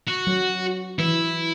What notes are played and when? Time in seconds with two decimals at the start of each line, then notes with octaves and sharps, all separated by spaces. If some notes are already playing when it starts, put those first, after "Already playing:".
0.08 F#4
0.27 F#3
0.99 E3 E4